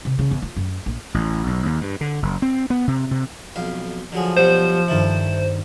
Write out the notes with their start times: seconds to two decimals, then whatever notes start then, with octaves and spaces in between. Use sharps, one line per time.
0.05 C3
0.19 C#3
0.31 E2
0.42 F4
0.56 F#2
0.86 A#1
1.14 A1
1.47 B1
1.66 D#2
1.81 G2
2.01 D3
2.22 F#1
2.42 C4
2.70 B3
2.88 C3
3.11 C3
3.56 B1 F2 F5
4.12 D3 F3 F#3 G#4
4.37 B2 F#3 G3 C5
4.88 G2 D#3 E4 A4 A6